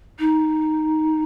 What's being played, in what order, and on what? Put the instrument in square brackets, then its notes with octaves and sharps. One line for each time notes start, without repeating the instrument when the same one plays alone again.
[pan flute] D#4